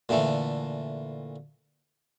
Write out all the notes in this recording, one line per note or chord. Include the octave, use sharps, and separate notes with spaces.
A#2 D3 E3 A3